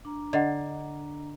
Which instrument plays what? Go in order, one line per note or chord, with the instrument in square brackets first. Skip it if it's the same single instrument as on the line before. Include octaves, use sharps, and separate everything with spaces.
[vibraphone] D4 A#5
[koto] D3 [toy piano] D5 D#5 F#5